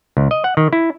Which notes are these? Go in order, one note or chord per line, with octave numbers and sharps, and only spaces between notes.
C#2
D#5
F#5
D#3
E4